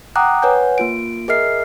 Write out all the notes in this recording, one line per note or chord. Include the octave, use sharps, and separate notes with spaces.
F#5 G5 A#5 D6 D#6 F#6
B4 C#5 F#5 G#5 G6
A#3 F4 D7
G#4 A#4 D#5 E5 F6 C7